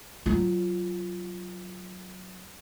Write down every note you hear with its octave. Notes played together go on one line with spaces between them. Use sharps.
F#3 F4